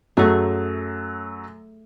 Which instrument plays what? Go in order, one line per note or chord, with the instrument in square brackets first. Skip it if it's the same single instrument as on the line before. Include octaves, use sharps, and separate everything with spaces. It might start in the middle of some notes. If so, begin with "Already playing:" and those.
[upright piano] F#2 F#3 [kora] A3 G#4